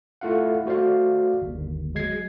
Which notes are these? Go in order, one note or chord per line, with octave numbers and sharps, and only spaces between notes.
A3 E4 F4 F5 F#5
A3 F#4 C5 D5 F5
G1 D#2
F#3 G#3 G#6 C7